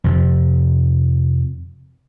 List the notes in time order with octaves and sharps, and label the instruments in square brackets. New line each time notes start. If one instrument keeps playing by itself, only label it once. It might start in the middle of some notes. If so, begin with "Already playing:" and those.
[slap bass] F2 C3 F3